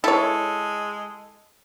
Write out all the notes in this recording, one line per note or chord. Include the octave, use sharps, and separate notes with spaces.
G#3 E4 A4 C#5